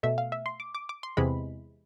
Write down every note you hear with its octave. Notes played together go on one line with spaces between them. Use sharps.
B2 A3 E5
F5
E5
C6
D6
D6
D6
C6
E2 C3 E3 G#3 B5